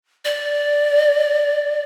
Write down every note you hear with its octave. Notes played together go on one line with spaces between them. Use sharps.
D5